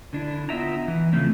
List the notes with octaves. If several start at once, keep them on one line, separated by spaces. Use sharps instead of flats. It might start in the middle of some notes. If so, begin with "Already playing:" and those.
D3 D4 E4
B3 F4 D#5 E5 G5 A#5
E3
C#3 F3 A3 C4 C#4